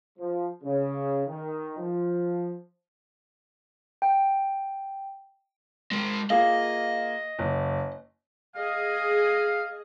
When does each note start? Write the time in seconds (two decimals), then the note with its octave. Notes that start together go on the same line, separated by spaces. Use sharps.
0.18 F3
0.63 C#3
1.27 D#3
1.77 F3
4.02 G5
5.91 G#3 A#4
6.30 A#3 F4 G#4 D#5
7.39 F#1
8.56 G#4 D#5 F5